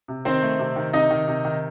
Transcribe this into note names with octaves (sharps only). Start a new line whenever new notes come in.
C3
D#3 C4 C5
A3
C3
D#3
C3 D#4 D#5
D#3
C3
D#3